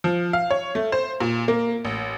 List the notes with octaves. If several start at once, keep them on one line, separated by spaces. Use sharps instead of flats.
F3
F5
C#5
A3
C5
A#2
A#3
A1